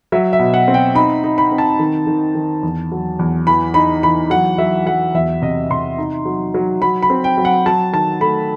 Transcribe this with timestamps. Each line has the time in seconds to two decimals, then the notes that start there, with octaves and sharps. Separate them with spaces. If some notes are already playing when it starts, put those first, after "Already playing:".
0.12 F#3 E5
0.33 E5
0.39 B2
0.54 F#5
0.68 C4
0.74 G5
0.95 D#4 B5
1.24 D#4
1.38 B5
1.52 C4
1.58 A5
1.79 D#3
2.07 D#3
2.35 D#3
2.63 E2
2.92 F#3
3.19 E2
3.47 E3 B5
3.74 D#4 B5
4.03 E3 B5
4.30 F#3 F#5
4.58 F#3 E5
4.86 F#3 F#5
5.14 E2 E5
5.42 C3 D#5
5.70 C3 C6
5.98 D#4
6.25 F#3
6.54 F#3
6.82 F#3 B5
7.02 B5
7.10 C4
7.24 G5
7.37 F#3
7.45 F#5
7.66 F#3 A5
7.93 D#3 A5
8.21 A3 B5